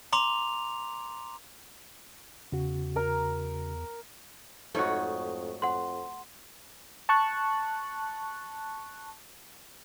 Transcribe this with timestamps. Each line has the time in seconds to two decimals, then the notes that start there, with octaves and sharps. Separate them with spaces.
0.13 A#5 C6 D6 F7
2.52 E2 C#3 F#4
2.96 A#4 A#5
4.75 F2 G#2 A3 D#4 F#4 C#5
5.62 F2 F#5 C6
7.09 A5 C#6 F#6